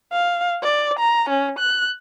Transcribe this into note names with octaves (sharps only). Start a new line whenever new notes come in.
F5
D5
A#5
C#4
F#6